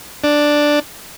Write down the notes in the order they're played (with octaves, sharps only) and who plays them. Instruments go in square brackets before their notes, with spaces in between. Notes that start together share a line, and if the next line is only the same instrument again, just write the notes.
[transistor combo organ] D4